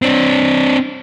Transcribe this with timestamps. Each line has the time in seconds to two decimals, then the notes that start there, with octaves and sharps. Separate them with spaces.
0.02 C4 D4